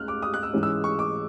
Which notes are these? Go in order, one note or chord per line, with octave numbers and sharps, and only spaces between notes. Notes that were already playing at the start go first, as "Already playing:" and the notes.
Already playing: C#2 G#3 F6 F#6
D6
D#6
F#6
E6
G#2 E3 G#3 C#4
E6
C#6
D6